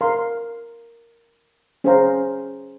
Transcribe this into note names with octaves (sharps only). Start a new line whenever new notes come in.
A#4 F5 C6
C#4 G#4 C5 F5 A#5